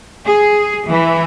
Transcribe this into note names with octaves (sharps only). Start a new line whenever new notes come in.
G#4
E3